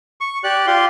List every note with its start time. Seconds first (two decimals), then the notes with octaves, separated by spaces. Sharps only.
0.21 C#6
0.44 G4 D5 F#6
0.67 F4 G4 C6